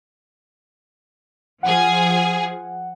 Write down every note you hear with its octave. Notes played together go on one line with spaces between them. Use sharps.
F3 G#4 F#5